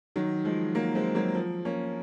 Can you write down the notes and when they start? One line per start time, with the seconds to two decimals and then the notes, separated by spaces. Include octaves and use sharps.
0.16 D#3 F#3
0.45 F3 G#3
0.75 F#3 A#3
0.95 G#3 C4
1.15 F#3 A#3
1.35 F3
1.65 A#3 C#4